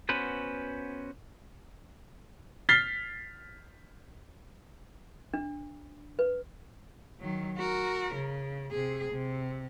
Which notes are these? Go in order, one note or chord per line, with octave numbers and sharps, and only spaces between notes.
B3 C#4 F#4 B4 C5
F6 A6 B6 C7 G7
D4
B4
D#3 F#3
F#4 A#4
C#3
C3 G#4
C3